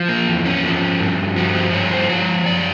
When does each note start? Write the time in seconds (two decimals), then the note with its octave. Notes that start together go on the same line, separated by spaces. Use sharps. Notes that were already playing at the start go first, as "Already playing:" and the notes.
Already playing: F3
0.09 A#3
0.28 E2
0.45 C#4
0.63 F3
1.00 G2
1.36 F3 F#4
1.55 C5
1.73 G2 C#5
1.91 C5
2.09 F3 C#5
2.46 F#2 D5